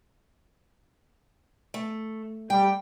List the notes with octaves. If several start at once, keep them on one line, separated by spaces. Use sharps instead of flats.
A3
G3 G5